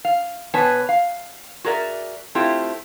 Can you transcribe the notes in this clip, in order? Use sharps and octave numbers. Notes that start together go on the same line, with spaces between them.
F5
B2 B3 B4 C#5 G#5 A5
F5
F#4 G#4 A#4 D5 E5
A3 C4 E4 F4 G4